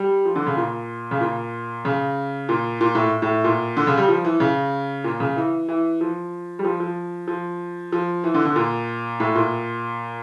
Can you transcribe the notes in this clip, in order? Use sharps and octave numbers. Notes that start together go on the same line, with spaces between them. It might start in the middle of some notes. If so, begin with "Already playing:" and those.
Already playing: G3
F3
D3
C#3
A#2
C#3
A#2
C#3
A#2
A#2
A2
A2
A#2
D3
C#3
G3
F3
E3
C#3
A#2
C#3
E3
E3
F3
G3
F3
F3
F3
F3
E3
D3
D3
A#2
A2
A#2